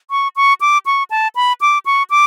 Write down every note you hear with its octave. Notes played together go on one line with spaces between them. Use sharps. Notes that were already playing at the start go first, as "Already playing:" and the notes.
C#6
C#6
D6
C#6
A5
B5
D6
C#6
D6